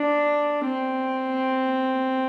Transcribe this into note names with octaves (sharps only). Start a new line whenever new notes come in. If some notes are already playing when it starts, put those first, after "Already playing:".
Already playing: D4
C4